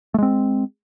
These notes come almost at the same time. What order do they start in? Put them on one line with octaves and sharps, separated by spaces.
A3 G#3 C4